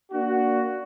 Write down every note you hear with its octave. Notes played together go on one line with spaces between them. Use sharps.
A#3 D4 F#4